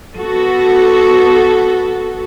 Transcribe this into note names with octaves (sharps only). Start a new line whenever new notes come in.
B3 F#4 A4